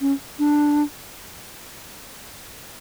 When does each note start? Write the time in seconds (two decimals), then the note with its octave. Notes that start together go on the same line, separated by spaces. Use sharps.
0.01 C#4
0.39 D4